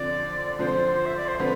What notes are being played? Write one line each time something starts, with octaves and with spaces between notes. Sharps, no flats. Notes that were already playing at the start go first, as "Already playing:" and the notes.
Already playing: D3 F3 C4 D5
D3 F3 C4 C5
E5
D5
C5
D3 F3 C4 B4